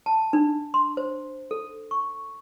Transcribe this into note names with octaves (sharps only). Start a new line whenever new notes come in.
A5
D4
C6
C5
A4
C#6